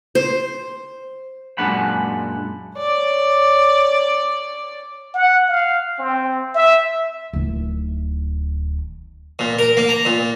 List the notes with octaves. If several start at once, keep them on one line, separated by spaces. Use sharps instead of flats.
C5
F#2 A#2 G#3 D4 F#5 B5
C#5 D5
F#5
F5
C4
E5
D1 D#3
A#2
A#4
A#3
A#5
A#2